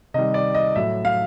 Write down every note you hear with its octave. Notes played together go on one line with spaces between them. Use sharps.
C3 D#3 G3 D#5
D5
D#5
A2 F#3 E5
F5